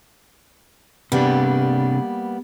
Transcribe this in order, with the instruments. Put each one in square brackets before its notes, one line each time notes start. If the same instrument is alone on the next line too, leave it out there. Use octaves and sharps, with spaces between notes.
[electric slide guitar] C3 D4 [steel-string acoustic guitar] G3 A#3 B3